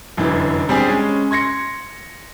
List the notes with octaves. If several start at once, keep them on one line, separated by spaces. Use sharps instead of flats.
F1 F#2 D3 E3
G3 C4 D4 G#4
G#3 C#4
C6 G#6 A#6 C#7